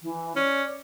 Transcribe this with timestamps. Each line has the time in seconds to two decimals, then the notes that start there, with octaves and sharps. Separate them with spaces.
0.02 E3
0.36 C#4 D5